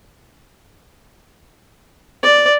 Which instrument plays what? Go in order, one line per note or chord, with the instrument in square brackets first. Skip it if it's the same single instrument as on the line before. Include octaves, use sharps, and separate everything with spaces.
[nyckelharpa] D5